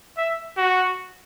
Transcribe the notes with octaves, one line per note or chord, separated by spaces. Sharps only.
E5
F#4